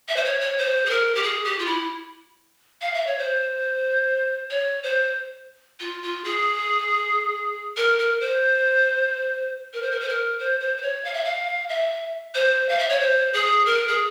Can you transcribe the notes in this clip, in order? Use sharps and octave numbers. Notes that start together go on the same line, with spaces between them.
E5
C5
C#5
C#5
C5
G#4
A#4
G4
G#4
G4
F4
E4
F5
E5
C#5
C5
C#5
C5
F4
F4
G#4
A#4
A#4
C5
A#4
C5
A#4
C5
A#4
C5
C5
C5
C#5
F5
E5
F5
E5
C5
F5
E5
C#5
C5
G#4
A#4
G#4